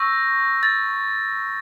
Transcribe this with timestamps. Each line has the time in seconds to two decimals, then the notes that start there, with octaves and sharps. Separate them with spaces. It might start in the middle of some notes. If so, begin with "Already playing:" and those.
Already playing: C#6 E6 G6 A#6
0.63 A6